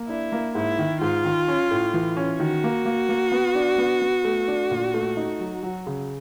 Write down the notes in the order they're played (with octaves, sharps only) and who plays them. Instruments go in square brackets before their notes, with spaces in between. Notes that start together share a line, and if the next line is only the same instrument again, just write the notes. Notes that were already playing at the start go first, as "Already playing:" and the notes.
Already playing: [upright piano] A#3
[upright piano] D4 [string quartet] E4
[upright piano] A#3
[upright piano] G#2 [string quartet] E4
[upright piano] D#3
[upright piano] G#2 [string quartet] F4
[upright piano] D#3
C#4
A2
E3
C#4
[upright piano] D#3 [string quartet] F#4
[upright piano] A#3
A#3
A#3
B3
D4
B3
B3
A3
D4
A#2
A3
D#4
F#3
F#3
C#3